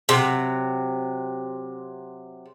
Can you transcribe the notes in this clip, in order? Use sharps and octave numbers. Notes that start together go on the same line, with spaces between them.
C3 F#3